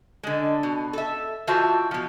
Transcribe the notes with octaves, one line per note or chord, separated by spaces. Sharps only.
D3 G#3
B2
A4 E5
E3 F4 F#4 C5 E5 A5
B2 F3